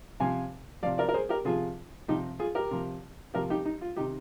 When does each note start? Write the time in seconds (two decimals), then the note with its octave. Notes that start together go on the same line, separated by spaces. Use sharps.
0.20 C3 F3 F5 G#5
0.83 F3 D5 F5
0.86 C3
0.98 A#4 D5
1.09 A#4
1.14 G#4 C5
1.29 G4 A#4
1.45 C3 F3 F4 G#4
2.08 C3 F3 D#4 G4
2.39 F4 G#4
2.55 G4 A#4
2.71 C3 F3
3.34 C3 F3 G4 A#4
3.50 D#4 G4
3.65 D#4
3.81 F4
3.96 C3 D#3 D#4 G4